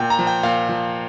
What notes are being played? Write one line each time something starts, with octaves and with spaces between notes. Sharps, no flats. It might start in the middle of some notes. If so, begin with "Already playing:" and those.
Already playing: A#2 G5
A#5
F3
G5
A#2 F5
F3